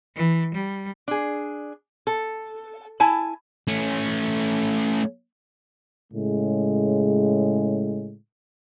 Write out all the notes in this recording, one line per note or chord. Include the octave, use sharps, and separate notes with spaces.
E3
G3
D4 G#4
A4
E4 G#5 A5
A3 C#4
A2 C#3 G#3